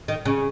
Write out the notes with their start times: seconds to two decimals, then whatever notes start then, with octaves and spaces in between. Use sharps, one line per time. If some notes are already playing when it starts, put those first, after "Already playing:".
0.08 D#3
0.25 C#3